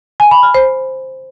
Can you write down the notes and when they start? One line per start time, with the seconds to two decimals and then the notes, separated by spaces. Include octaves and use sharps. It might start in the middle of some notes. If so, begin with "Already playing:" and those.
0.20 G#5
0.31 B5
0.43 F6
0.54 C5